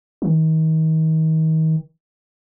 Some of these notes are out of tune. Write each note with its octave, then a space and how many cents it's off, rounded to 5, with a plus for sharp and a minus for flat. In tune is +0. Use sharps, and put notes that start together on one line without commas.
D#3 +35